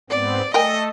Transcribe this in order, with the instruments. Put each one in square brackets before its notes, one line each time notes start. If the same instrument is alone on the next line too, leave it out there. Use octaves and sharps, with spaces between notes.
[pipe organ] G#2 B3 C4 [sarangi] D5
[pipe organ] A3 A4 [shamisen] A#4 G5 G#5 [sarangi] D#5